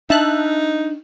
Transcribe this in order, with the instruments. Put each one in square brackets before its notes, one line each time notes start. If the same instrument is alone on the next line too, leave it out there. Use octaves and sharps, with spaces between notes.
[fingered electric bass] D4 [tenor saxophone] D#4 [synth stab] E5 A5 F#6